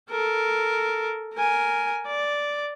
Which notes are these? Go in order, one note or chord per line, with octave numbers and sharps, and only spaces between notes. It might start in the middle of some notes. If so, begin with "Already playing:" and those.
A4 A#4
A#4 G#5
D5